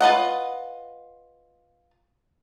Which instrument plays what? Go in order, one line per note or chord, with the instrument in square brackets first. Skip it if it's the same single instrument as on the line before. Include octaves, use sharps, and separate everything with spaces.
[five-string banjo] F4 B4 D#5 F#5